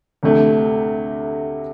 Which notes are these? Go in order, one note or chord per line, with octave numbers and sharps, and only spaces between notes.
D2 C3 A3